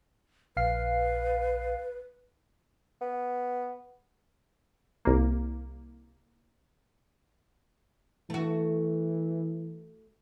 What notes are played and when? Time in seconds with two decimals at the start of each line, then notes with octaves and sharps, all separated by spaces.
0.57 A#1 B4 F5 C7
3.01 B3
5.05 C2 A#3
8.30 E3 A3 F#4